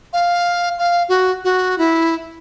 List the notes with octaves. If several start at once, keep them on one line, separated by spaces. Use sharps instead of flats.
F5
F5
F#4
F#4
E4